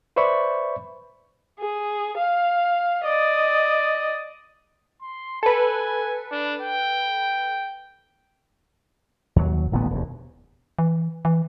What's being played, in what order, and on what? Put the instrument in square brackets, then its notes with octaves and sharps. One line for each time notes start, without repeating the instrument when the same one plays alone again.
[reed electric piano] B4 C5 D5 E5 B5 C#6
[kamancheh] G#4
F5
D5 D#5
[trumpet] C6
[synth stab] A4 B4 [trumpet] G#5
[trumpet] D4
G5
[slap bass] D#2 F#3
D1 A1 A#2 B3
E1 D#2
[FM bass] E3
E3